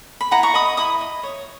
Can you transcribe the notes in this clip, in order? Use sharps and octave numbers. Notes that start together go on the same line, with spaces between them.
B5
E4 F#5 A#5
A#5 C#6
D#5 B5 D#6
E4 B5 D#6
D#5
C#5